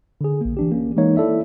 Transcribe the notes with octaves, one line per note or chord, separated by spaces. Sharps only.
D3 G#4
A#1 A#3
E3 D4 G4
A#3 C#4
E3 G#3 A#3 D#4 C#5
E4 A4 D5 E5